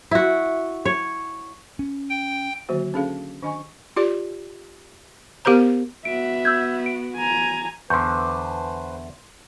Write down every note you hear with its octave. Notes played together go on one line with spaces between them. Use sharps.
E4 F#4
C#5
C#4
G5
D3 D#3 F#3 A#3 F#4 C5
C#4 D4 G#4 A4 F5
D#3 D4 D#5 G#5 C#6
F4 G4 D5
B3 G4 A#4 C5 A#5
B3 F#4 E5 D7
E6 G6 G#6
D7
G#5 A#5
E2 D3 B4 C5 C6 C#6 G6